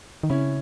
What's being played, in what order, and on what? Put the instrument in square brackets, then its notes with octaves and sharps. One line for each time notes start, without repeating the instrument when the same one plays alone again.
[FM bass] D#3
[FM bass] C#3 [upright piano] C#4 E4